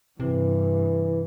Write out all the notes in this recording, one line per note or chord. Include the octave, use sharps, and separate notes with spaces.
G2 C3 E3